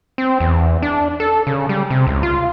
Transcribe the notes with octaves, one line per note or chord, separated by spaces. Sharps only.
C4
E2
D4
A4
C#3
G3
C3
C#2
F4